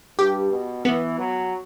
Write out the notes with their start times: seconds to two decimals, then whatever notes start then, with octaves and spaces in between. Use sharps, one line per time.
0.19 G2 G4
0.52 B2
0.85 E3 B3
1.18 F#3